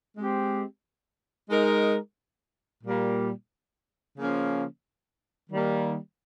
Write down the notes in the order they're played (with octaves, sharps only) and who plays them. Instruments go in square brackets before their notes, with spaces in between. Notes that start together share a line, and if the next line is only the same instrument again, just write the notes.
[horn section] G#3 C4 G4
G#3 D#4 A#4
A#2 G3 A#3
C#3 F3 A#3 C#4
D#3 G3 A#3